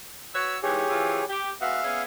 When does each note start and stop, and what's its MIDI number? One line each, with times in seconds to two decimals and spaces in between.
0.34 0.57 66
0.34 0.57 71
0.34 0.57 73
0.34 0.59 88
0.63 0.83 44
0.63 0.83 52
0.63 1.25 67
0.63 1.25 68
0.63 1.25 73
0.90 1.21 52
0.90 1.21 60
0.90 1.21 65
1.30 1.50 67
1.61 1.80 56
1.61 1.80 59
1.61 1.80 66
1.61 2.02 76
1.61 2.02 77
1.83 2.04 59
1.83 2.04 61
1.83 2.04 68